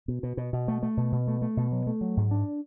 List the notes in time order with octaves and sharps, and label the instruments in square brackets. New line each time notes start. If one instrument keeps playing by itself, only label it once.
[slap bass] B2
B2
B2
B2
A3
A3
B2
B2
A3
A3
B2
F#3
A3
F#3
G#2
D4